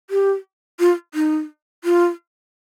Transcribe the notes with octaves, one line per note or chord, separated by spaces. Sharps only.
G4
F4
D#4
F4